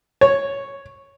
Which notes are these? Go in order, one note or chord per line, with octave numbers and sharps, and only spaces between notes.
C#5